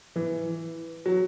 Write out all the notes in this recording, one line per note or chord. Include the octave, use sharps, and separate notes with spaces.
E3
F#3